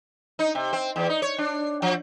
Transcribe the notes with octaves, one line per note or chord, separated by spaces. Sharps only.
D#4
C3
C4
E2
D#4
C#5
D4
F3